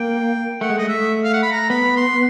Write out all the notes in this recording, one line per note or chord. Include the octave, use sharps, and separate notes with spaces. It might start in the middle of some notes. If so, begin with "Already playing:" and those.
Already playing: A#3 G5
A3 F#5
G#3
A3 D#5
E5
F5
F#5
B5
A#5
B3 B5
C6